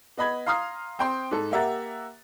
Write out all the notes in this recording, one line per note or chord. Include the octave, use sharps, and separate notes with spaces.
B3 D#5 B5 G#6
F5 A#5 C6 D#6 F6 C7
C4 G5 C6
G#2 A4
A#3 G4 E5 F#5 A#5 A6